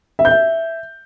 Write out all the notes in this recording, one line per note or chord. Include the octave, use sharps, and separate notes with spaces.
E5
G6
E5